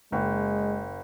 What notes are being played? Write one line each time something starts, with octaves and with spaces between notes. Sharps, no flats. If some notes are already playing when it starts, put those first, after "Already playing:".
F#1 G#3 G5